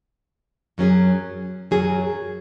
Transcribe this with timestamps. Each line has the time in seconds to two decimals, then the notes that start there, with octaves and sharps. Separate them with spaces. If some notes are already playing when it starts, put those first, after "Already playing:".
0.78 F#2 F#3 C#4 G#4
1.71 F#2 F#3 C#4 G#4